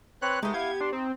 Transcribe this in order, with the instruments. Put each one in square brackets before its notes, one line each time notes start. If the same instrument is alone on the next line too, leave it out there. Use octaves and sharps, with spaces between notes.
[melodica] C4 B4 C#5 [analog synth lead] F#6
[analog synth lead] G#3 [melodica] A3 D#4 [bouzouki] B3 G4
[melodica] E4 F5 [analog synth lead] G#6
[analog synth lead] D4 [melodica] C6
[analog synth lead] C4 [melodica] D#4